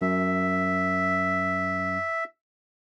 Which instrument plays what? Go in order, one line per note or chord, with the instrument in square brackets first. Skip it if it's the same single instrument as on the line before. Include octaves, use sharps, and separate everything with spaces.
[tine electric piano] F#2 [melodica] E5